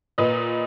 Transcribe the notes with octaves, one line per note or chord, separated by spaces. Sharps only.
A#2 B4 D#5